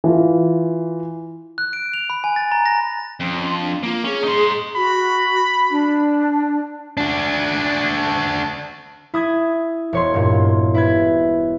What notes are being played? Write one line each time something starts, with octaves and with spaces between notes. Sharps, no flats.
E3 F4
F#6
D7
F7
B5
G#5
A6
A#5
A#6
F2 C#4
C6
D4
A#3 F4
C#4 G#4
D#4 C6
F#4 B5
D4
D4 F#4
E4 D#6 G#6
E1 C#5 C6
G2 A#2
E4 B4 G#6